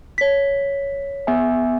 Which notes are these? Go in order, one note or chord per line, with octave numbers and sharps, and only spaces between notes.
C#5 B6
B3 E5 G#5